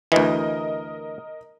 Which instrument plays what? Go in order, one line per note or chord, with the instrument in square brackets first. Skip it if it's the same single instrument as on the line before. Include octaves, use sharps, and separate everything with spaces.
[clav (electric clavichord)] D2 E3 [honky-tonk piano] A#4 D#5